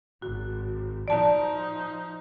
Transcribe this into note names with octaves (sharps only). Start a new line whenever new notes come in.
G#1 F#4
F3 D#4 D5 A5